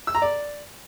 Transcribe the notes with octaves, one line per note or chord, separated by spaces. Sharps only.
E6
A#5
D5